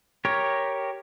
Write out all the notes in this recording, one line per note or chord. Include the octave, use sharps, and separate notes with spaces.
G4 A#4 C#5